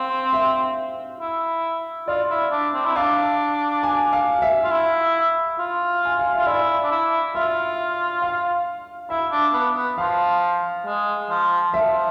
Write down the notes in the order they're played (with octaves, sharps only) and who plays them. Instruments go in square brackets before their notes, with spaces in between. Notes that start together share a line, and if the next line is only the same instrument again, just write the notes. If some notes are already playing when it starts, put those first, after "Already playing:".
Already playing: [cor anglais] C4 [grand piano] F5
[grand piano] E5
[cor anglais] E4
[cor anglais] F4 [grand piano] D5
[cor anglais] E4
D4
C4
E4
[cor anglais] D4 [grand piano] F5
[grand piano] G#5
F5
F5
E5
[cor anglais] F4
E4
F4
[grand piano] G#5
F5
[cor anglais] F4 [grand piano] E5
[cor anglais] E4 [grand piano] D5
[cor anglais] D4
E4
[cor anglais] F4 [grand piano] E5
[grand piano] F5
[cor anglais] E4 [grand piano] E5
[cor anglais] D4
B3
B3
[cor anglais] F3 [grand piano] F5
[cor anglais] G#3
F3
[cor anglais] F3 [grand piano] E5